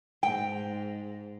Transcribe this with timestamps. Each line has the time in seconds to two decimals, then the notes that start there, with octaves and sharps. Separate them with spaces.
0.23 G#2 G5